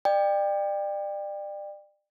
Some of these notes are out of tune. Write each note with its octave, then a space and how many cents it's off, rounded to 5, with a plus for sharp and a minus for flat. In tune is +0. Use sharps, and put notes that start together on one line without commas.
D5 +30 G5 +20